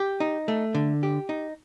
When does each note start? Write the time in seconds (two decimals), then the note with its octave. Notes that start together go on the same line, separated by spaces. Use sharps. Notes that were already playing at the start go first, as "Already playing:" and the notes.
Already playing: G4
0.20 D#4
0.48 A3
0.75 D3
1.03 G4
1.29 D#4